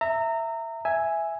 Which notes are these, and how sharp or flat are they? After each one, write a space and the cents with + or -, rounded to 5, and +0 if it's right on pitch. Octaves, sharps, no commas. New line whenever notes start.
E5 +0 A#5 -25
E5 +0 G#5 +0